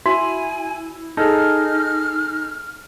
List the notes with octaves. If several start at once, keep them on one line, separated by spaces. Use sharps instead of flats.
E4 F#4 G#5
D#4 G#4 A4 F6